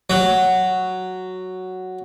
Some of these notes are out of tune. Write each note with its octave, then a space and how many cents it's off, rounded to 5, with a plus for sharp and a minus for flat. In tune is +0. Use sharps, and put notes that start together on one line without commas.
F#3 +0